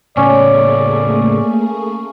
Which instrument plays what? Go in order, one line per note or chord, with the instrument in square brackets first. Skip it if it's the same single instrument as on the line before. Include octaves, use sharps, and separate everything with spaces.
[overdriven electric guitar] A2 C#3 [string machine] A3 A#3 G#4 [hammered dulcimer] C#4 [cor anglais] D5